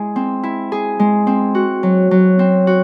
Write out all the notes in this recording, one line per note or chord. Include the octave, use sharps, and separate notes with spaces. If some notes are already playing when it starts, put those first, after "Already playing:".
Already playing: G#3 E4 G#4
C4
E4
G#4
G#3
C4
F#4
F#3
F#3
C4
F#4